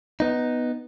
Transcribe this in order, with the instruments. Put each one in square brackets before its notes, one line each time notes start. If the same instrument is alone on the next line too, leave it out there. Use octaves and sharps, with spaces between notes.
[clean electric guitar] B3 D#4